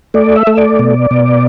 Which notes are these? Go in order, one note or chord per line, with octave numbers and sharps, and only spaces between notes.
A3 D5
E5
A3
D5
B2
B2